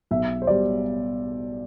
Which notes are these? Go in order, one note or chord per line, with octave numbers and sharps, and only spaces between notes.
B1 E5
C5
B2 G3 D5